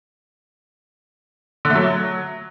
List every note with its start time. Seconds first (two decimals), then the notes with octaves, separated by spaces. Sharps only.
1.65 D3
1.70 A3
1.75 F#3